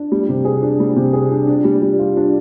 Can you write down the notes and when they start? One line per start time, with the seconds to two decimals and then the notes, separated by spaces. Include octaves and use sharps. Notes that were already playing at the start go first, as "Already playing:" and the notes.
Already playing: D4
0.12 G3
0.29 C3
0.45 G#4
0.62 D4
0.80 G3
0.96 C3
1.13 G#4
1.31 D4
1.47 D4
1.64 G3
1.82 G3
1.99 F4
2.17 D4